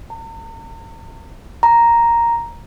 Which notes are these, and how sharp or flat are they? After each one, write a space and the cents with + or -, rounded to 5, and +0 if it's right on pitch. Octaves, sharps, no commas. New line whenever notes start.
A#5 -45
A#5 +0